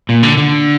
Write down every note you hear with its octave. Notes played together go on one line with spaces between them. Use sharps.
A#2
D3
D3